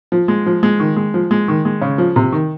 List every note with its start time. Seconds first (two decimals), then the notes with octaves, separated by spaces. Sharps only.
0.12 F3
0.28 G#3
0.46 F3
0.63 G#3
0.80 D#3
0.96 G#3
1.14 F3
1.31 G#3
1.48 D#3
1.65 G#3
1.82 C#3
1.98 F3
2.16 C3
2.32 D#3